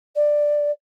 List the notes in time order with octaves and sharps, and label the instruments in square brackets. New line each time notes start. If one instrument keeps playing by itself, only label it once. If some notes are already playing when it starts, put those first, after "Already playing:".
[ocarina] D5